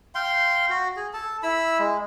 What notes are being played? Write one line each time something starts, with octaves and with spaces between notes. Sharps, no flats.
F5 G5 C6
F#4
G#4
A4 A5
E4 B5 E6
G#3